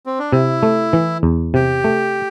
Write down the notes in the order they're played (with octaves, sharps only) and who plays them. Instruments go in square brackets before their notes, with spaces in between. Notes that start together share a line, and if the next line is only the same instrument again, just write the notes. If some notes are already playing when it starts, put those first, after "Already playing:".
[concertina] C4
D4
[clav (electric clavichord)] C3 [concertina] E4
[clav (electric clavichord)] A3
E3
E2
[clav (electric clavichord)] C3 [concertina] G4
[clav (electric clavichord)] A3